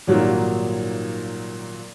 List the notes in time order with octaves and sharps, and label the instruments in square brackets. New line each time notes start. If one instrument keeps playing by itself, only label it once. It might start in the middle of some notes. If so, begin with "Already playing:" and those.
[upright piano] G#1 A#2 F#3 G3 A#3